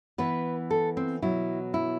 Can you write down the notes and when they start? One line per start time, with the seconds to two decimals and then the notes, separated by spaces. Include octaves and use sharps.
0.18 E3 B3 B4
0.71 A4
0.97 C4
1.22 B2 F#3 B3 E4
1.74 E4